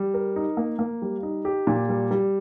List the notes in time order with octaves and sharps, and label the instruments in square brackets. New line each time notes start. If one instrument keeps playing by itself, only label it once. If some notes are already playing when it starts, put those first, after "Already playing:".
Already playing: [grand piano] G3
A#4
D#4
A#3
A#3
G3
D#4
G4
A#2
G3
G3